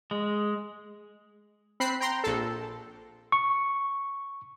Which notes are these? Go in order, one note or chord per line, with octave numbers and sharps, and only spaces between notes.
G#3
C4 B5 F#6 C7
G5 A#5 C6
A#1 A4
C#6